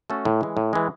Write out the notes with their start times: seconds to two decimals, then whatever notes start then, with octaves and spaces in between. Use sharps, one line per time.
0.10 A3 C#4 F#4 A4
0.25 A2
0.41 E3 G#3
0.57 A2
0.73 E3 G#3